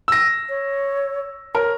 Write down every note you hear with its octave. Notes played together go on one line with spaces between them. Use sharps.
E6 A#6
C#5
A#4 C#5